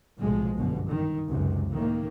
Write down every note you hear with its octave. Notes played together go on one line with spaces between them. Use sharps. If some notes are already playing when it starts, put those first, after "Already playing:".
B1 A2 C3 F3 G#3
G1 F#2 B2
D#3
C#2 F#2 C3
A2 D#3 A#3